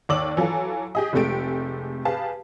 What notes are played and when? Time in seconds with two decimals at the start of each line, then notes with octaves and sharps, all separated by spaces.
0.09 D#2 C#5 D5 D6 E6 F#7
0.37 E3 F#3 F4 A4
0.95 G4 G#4 D#5
1.13 F1 C3 G#3 A3 G4 D7
2.05 G4 G#4 B4 F5 A5